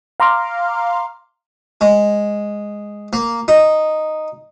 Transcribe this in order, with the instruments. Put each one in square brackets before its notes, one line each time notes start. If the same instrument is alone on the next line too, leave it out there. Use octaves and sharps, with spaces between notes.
[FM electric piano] F5 A#5 C6 D6 F6
[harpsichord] G#3
A#3
D#4